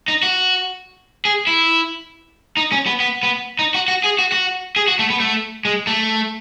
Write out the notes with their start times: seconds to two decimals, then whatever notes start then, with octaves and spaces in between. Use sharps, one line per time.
0.08 D#4
0.23 F#4
1.25 G#4
1.47 E4
2.57 D#4
2.72 C#4
2.86 B3
3.00 B3
3.23 B3
3.59 D#4
3.74 F#4
3.88 F#4
4.04 G#4
4.19 F#4
4.32 F#4
4.76 G#4
4.88 F#4
4.99 A3
5.10 B3
5.20 A3
5.65 G#3
5.87 A3